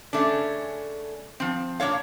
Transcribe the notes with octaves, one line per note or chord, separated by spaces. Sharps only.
C#3 A3 C#4 D4
F3 C4
A#2 C4 D4 C#5 F5